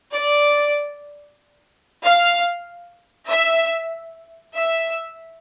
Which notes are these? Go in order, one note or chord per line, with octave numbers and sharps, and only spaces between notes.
D5
F5
E5
E5